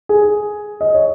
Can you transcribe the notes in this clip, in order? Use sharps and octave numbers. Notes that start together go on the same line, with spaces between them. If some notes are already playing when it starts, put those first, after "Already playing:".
G#4
D#5
C#5